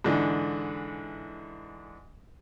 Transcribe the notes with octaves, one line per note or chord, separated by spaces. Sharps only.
G#2 D3 E3